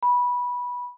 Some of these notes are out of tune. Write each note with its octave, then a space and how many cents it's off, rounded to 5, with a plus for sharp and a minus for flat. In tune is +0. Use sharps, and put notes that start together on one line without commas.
B5 -15